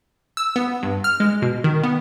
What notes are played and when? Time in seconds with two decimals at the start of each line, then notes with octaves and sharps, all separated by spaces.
0.37 E6
0.56 B3
0.83 G2
1.04 F6
1.20 G#3
1.42 B2
1.64 D#3
1.84 B3